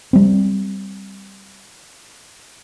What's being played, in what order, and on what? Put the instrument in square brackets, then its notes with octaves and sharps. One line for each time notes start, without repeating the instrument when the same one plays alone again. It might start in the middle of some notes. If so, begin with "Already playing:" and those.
[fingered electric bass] G3 C4